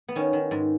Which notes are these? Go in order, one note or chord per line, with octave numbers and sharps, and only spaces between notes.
B3
D#3 C#4
D#3
G#2